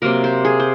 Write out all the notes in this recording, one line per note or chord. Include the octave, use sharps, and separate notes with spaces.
C3 F#3 A#3 A#4
C5
G#4
C5